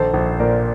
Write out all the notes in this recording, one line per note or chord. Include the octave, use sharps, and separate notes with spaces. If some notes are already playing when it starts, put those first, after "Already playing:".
Already playing: A#1 D#3 A4 C5
A#1
A#2 A#4 D5